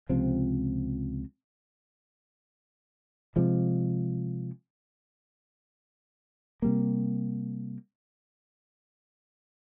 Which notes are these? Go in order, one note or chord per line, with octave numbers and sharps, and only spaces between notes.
C#2 C3 F3 C4
C3 F3 G#3
C3 G3 A#3